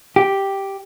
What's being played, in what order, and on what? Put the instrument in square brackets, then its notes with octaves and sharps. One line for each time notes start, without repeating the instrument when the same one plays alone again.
[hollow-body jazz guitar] G4